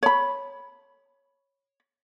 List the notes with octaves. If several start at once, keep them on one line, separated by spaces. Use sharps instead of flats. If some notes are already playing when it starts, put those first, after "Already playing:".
C#5 B5